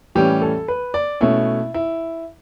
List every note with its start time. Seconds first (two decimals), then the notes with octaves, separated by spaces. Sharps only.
0.15 A2 E3 G3 C#4 G4
0.42 A4
0.68 B4
0.94 D5
1.21 B2 A3 C#4 E4
1.74 E4